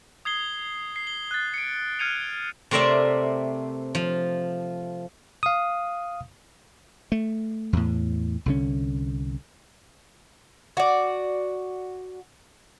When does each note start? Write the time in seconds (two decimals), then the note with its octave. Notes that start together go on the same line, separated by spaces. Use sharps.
0.25 D#6 G#6 C7 G7
0.96 C7
1.07 G7
1.31 F#6 A6
1.54 C#7 D7
1.99 F6 F#6 G#6 C#7 D#7 F7
2.71 C3 A3 C4 A#4 D5 E5
3.95 F3
5.43 F5 D#6
7.12 A3
7.73 E2 A2
8.46 C2 D3 C#4
10.77 F#4 D5